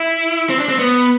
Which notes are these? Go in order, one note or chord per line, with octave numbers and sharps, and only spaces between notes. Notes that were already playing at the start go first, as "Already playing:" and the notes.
Already playing: E4
C4
D4
C4
B3